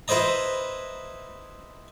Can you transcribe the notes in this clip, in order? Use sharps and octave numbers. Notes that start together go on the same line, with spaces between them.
E4 B4 C5 D#5 A#5